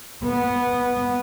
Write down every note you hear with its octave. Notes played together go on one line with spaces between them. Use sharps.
B3